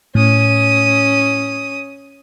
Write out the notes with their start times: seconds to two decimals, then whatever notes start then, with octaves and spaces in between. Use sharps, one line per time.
0.15 A2 C#4 D#6